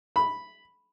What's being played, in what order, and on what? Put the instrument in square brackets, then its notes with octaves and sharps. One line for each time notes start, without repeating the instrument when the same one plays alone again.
[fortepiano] B5